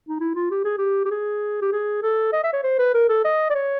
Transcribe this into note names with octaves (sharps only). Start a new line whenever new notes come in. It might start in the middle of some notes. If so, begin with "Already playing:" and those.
D#4
E4
F4
G4
G#4
G4
G4
G#4
G4
G#4
A4
D#5
E5
C#5
C5
B4
A#4
A4
D#5
D5
C#5